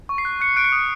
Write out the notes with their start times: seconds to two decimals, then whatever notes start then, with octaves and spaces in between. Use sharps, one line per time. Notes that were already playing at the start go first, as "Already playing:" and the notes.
0.09 C#6
0.18 C7
0.25 F#6
0.41 F#6 C#7
0.56 F#6 D7
0.65 C#7
0.72 D#6